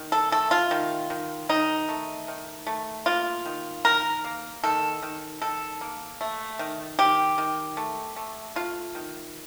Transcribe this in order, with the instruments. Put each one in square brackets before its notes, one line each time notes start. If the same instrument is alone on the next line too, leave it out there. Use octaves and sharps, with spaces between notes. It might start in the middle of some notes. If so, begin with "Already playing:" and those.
Already playing: [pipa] D#3
A4
A3 A4
F4
D#3
D#3
D#3 D#4
A3
D#3
A3
A#3 F4
D#3
D#3 A#4
A#3
D#3 A4
D#3
D#3 A4
A#3
A3
D#3
D#3 G4
D#3
A3
A3
A3 F4
D#3